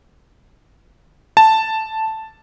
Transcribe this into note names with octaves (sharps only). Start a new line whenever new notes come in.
A5